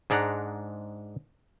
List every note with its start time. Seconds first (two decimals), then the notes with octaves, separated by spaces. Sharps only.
0.10 G#2 G#3 D4 F#5 A#5